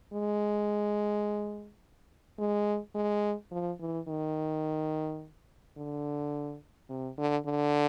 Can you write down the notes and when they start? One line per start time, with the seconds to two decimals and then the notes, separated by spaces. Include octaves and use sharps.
0.13 G#3
2.39 G#3
2.95 G#3
3.51 F3
3.80 E3
4.08 D#3
5.77 D3
6.90 C3
7.18 D3
7.46 D3